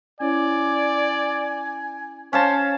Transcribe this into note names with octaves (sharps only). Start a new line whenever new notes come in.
C#4 E4 C#5 D5 G#5
C#4 C5 F5 A5